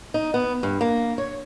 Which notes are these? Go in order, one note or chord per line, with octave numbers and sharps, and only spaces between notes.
D#4
B3
G2
A#3
C#5